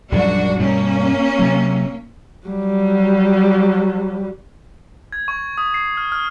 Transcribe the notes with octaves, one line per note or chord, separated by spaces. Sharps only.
A#1 F#2 G3 D4 F#4
G2 B2 G3 A#3 C#4
C3 F#3
F#3 G3
G#6
C#6
D#6
C7
F6
F6